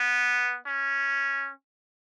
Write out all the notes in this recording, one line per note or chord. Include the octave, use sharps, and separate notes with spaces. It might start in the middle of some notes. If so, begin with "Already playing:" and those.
Already playing: B3
C#4